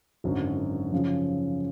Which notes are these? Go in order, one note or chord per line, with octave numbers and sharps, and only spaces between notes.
G#1 F#2 D3 F#3
F#2 C#3 F3